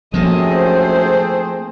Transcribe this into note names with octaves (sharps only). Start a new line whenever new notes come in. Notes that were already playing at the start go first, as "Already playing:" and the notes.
F#2 F3 A3 A#3 C4 G#4 D#5
C5